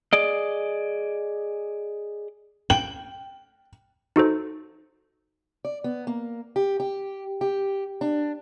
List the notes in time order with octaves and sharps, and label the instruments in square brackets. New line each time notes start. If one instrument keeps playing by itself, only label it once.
[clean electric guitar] G#4 D5 D#5
[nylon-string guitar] G5 [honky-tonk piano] F#7
[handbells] D#4 F#4 A4 C5
[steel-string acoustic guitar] D5
B3
A#3
G4
G4
G4
D4